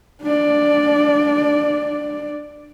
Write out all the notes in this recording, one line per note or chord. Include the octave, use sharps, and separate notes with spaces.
D4 D5